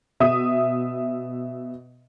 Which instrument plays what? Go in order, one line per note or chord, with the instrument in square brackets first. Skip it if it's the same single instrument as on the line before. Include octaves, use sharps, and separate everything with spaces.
[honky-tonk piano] B2 E5 D#6